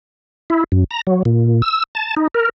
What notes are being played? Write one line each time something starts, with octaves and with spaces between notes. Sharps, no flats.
E4
F#2
A#5
F#3
A#2
E6
A5
D#4
A#4